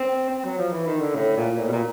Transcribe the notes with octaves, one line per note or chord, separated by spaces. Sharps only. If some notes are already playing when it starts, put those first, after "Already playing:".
Already playing: C4
C4
F#3
F3
E3
D#3
D3
A2
A#2
A2
B2
A#2